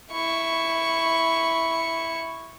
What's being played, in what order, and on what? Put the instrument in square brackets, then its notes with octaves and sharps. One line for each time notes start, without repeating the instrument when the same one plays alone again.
[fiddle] E4 C#6